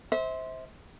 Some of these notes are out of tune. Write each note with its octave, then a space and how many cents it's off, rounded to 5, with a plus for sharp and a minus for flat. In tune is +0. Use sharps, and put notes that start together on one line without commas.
C5 +0 E5 -35